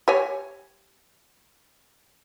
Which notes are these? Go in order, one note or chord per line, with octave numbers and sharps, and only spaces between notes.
G4 C#5 G#5